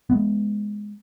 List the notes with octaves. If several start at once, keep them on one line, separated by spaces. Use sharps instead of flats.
G#3 A3 B3